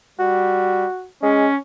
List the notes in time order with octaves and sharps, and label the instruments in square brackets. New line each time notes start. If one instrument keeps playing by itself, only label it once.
[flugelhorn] G3 [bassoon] F#4
[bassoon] G#3 [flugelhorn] C#4